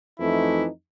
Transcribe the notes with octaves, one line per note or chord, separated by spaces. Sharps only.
F2 E3 A3 D#4 E4